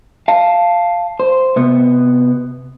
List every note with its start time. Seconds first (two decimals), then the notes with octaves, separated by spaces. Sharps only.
0.28 F5 A5
1.20 C5
1.56 C3 B3